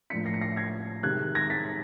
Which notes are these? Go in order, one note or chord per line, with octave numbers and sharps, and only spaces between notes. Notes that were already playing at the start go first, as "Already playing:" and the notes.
A2 F3 A#3 D4 B6 C#7
A#6 C7
C#7
A#6 C7
G#6 A#6
C3 D#3 G#3 F#6 G#6
G#6 A#6
A6 B6